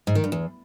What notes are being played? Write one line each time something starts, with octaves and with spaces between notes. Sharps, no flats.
G#2
D#3
G2
E2